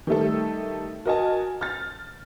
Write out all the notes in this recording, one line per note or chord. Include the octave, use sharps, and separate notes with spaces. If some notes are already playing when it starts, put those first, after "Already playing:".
D#3 G3 A3 A4
F#4 A#4 D#5 G#5 A5
F6 A6